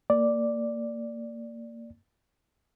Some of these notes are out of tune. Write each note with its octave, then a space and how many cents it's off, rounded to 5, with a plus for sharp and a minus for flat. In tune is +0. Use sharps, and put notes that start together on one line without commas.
A#3 -20 D5 +0